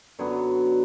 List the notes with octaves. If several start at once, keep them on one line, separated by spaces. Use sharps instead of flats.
F#2 D3 F#3 B3 C#5